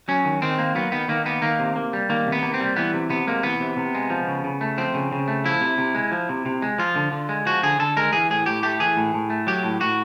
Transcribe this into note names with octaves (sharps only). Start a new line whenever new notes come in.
F#3 C#4
D#3
D#3 C4
A#3
F#3 B3
D#3 B3
D#3 A#3
A#3 B3
D#3 A#3
C3
A#3
G3
D#3 A#3
C3
B3
A#3
C4
G3
E3 B3
C3
C3 B3
G#3 A#3
E3 B3
C3
C3
G#3
F3
C#3
C#3
A3
F3 C4
C#3
C#3
A3
F3 E4
C3
C3
G#3
F3
C3
C3
G#3
F3 F4
D3
D3
G#3
F3 F#4
D3 G#4
D3 A4
G#3 A#4
E3 G#4
A2 G#4
A2 G4
A3 G4
E3 G#4
A2
A2
A3
F#3 G4
A2
A2 F#4